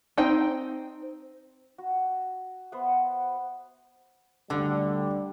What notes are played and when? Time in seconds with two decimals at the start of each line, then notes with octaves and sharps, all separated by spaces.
0.18 C4 D#4 G5
1.78 F#4
2.72 B3 C5 E5 F#5
4.50 D2 D3 G3 A4